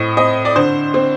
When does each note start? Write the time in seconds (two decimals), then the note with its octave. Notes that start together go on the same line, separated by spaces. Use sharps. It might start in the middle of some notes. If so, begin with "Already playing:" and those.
Already playing: A2 C4 D#5
0.17 C4 D#5
0.45 D5
0.56 D3 C5
0.94 C4